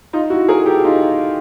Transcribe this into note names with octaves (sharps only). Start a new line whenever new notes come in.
D#4 F4
E4 F#4
G#4 A#4
G4 A4
D#4 F4